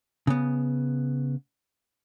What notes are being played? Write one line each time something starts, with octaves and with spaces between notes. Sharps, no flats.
C#3 B3